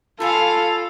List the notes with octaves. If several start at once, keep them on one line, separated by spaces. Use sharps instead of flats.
F4 A4 C#5 F5 G#5 B5